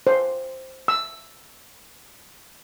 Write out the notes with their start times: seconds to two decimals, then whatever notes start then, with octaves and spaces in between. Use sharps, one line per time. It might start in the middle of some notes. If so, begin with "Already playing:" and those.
0.07 C5
0.88 E6